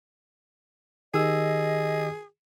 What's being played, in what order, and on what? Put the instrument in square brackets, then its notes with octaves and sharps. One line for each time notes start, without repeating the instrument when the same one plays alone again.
[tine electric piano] D#3 G4 E6 [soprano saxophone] G#4 [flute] D#5